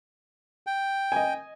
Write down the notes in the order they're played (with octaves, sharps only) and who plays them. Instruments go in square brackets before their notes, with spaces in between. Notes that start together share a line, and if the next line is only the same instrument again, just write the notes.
[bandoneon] G5
[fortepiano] D#5 G#5